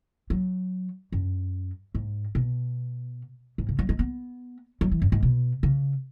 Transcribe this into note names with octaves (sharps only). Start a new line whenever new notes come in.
F#3
F#2
G#2
B2
G#2
C#3
F#3
G#3
B3
F#3
E3
F#2
G#2
B2
C#3